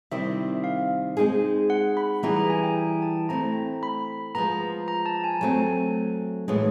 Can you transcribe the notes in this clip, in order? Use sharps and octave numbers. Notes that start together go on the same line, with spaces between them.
C3 D#3 G3 C4 E4 E5
F5
G#3 C4 D#4 G#4
F#5
B5
E3 G3 B3 E4 G#4 A#5
A#5
G#5
G5
G#5
A5
A3 C4 E4 A#5
B5
F3 G#3 B3 A#5
A#5
A5
G#5
F#3 A3 C4 G#5
A2 E3 G#3 B3 D#4